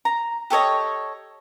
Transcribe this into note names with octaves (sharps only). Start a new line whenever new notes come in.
A#5
G4 A4 C#5 D#5